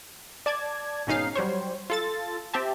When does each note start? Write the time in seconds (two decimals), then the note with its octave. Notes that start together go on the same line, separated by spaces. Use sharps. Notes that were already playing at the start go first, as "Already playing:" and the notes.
0.46 D5 A5 G#6
1.07 G#1 B2 C#4 D#4 F5 C7
1.36 F#3 G3 C5 C#5
1.90 F4 A4 A6
2.54 C4 G4 E5 A5